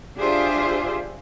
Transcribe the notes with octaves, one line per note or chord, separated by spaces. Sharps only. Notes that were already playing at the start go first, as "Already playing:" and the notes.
D4 F4 G4 G#4 C5 E5